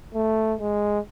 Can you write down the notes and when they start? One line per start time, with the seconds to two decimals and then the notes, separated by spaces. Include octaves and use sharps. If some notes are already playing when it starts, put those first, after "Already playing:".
0.14 A3
0.59 G#3